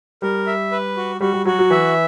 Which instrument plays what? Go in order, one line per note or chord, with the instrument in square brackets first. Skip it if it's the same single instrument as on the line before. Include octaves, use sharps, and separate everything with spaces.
[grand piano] G3 [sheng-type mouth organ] A#4
[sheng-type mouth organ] E5
B4
F#4
[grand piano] G3 [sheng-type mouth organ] F#4
[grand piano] G3
[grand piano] F#3 [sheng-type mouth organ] F#4
[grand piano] F#3
[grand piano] E3 [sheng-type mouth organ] E5